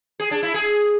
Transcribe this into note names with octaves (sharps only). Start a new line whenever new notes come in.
G#4
D4
E4
G#4